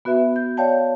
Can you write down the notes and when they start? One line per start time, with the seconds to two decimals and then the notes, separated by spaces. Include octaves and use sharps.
0.05 B3 F#4 B4 E5
0.36 G6
0.57 C#5 D5 F5 G5 A5 G6